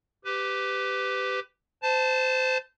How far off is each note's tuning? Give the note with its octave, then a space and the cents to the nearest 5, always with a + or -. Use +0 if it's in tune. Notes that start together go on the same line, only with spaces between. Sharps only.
G4 +0 B4 +25
C5 -25 A5 +0